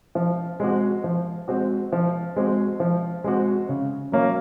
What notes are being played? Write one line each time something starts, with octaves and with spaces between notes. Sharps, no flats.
F3
G#3 C4 F#4
F3
G#3 C4 F#4
F3
G#3 C4 F#4
F3
G#3 C4 F#4
C#3
F#3 A#3 C#4